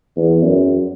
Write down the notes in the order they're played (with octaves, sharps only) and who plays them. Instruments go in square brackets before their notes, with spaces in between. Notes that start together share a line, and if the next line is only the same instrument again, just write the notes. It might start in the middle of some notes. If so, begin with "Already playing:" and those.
[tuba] E2
F#2